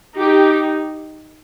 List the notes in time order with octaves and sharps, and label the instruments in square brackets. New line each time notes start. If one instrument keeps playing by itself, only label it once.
[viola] D#4 [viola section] G4